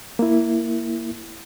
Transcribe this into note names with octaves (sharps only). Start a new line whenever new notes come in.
A#3 E4